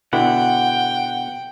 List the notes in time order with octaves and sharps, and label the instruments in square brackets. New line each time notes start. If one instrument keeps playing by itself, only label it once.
[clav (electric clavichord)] B2 D3 E4 [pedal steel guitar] F#5 [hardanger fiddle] G5